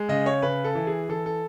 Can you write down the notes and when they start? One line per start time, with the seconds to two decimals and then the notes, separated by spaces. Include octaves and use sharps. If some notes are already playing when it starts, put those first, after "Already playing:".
Already playing: G#3
0.09 C#3 D#5
0.26 C#5
0.42 C#3 B4
0.64 A4
0.75 E3
0.87 G#4
1.09 E3 A4
1.26 A4